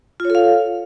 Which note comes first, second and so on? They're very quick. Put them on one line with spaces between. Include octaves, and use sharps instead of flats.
F4 C#5 A4 F5